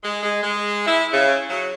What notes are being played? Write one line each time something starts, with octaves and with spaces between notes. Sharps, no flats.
G#3
G#3
G#3
E4
C#3
F#3